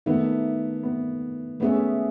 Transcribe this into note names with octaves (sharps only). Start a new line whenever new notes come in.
D#3 A3 B3 D#4 A4 E5
B3
A3 B3 C#4 G#4 C#5 E5